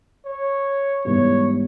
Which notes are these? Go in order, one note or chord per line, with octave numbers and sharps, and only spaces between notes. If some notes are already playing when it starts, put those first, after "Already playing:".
C#5
G#2 E3 G3 B3 C#5